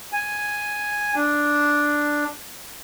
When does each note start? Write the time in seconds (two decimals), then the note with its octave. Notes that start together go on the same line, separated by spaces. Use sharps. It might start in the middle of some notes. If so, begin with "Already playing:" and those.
0.13 G#5
1.15 D4